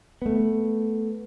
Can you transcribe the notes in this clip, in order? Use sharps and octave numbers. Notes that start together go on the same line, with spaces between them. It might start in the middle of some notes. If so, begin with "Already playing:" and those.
A3 B3